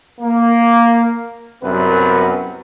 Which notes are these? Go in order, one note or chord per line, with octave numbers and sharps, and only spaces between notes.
A#3
C2 F#2 B3 C4 B4